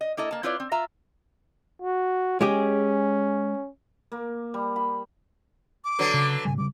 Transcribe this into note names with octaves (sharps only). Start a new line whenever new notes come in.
D#5
A#3 E4 A4 D#5
A#3 A5
C4 E4 F4 B4 C#5 D5
C4
F4 E5 A#5
F#4
G#3 C#4 G4 G#4
A#3
G3
B5
D6
D3 F#3 B3
C#3
A2 C#3 G3 G#5
C#3 G3 D6